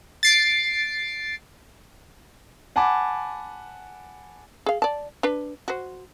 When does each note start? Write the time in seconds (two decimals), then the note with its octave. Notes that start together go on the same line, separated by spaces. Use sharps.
0.23 A6 C7 D7
2.76 F#5 G#5 A5 B5 D6
4.66 G#4 F5
4.82 D5 A5
5.23 D4 B4
5.68 F#4 C5